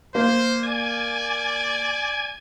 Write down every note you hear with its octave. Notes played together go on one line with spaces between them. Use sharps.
A#3 C5
D5 G#5 G#6